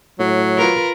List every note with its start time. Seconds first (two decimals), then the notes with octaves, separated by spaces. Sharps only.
0.19 A2 F#3
0.58 F4 A#4 B4